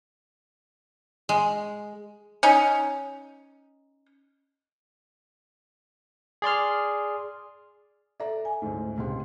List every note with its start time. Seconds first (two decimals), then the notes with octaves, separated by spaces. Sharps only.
1.29 G#3
2.43 C#4 D#4
6.42 G#4 D5 C6 F6
8.20 A4 D5 E5 A#5
8.45 G#5
8.62 A1 D2 G#2
8.98 C#2 C3 C6